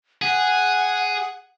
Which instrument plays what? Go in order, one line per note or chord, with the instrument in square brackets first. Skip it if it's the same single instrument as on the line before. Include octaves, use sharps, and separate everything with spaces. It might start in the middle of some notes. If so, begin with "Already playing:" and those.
[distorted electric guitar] G#4 [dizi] F#5